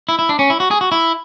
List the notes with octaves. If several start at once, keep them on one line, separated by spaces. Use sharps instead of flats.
E4
E4
D4
C#4
E4
F#4
G#4
F#4
E4